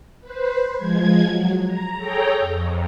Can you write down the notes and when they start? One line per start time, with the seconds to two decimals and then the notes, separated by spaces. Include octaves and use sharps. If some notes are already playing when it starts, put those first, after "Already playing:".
0.21 B4 C5
0.77 F3 G#3 G#6
1.23 F#3
1.65 A#5
1.97 G#4 A4 C#5 G5 A#5
2.39 F2